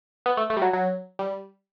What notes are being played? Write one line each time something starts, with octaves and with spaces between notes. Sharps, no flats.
B3
A3
A3
G3
F#3
F#3
G3